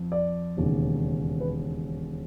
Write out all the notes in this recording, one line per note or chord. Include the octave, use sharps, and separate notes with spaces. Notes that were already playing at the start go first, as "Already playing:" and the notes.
Already playing: F2
D5
E1 D#2 C#3
B4